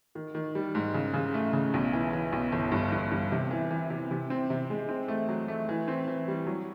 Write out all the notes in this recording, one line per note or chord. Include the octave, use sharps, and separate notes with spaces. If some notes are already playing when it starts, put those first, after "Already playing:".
D#3
D#3
G3
G#2
C#3
C#3
A3
C#3
B1
E3
E3
B1
G1
G2
G2
G2
C3
E3
E3
C3
C3
C4
C3
G#3
C4
A3
F#3
A3
E3
C4
E3
G3
F#3